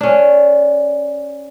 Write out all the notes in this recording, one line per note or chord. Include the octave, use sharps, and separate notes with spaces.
C#4 D4